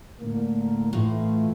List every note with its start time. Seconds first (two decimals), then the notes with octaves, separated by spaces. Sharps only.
0.21 A2 D3 A#3
0.93 A2 E3 A3 F4